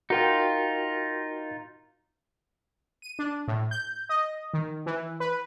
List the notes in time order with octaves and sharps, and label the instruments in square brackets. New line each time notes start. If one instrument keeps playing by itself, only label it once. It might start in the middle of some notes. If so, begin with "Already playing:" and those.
[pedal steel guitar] D#4 F4 [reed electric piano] F#4 A#4 G5
[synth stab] D#7
D4
A2
G6
D#5
D#3
E3
B4